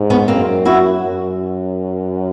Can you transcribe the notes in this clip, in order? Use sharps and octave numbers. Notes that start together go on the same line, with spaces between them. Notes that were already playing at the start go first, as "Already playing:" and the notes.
Already playing: G#2
B3 C#4
F#2 A#3 C4
E4 F#4
F#2